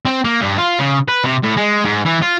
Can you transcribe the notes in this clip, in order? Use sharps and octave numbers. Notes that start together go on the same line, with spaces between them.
C4
A#3
G2
F4
C#3
B4
C3
A2
G#3
G#2
E3
F4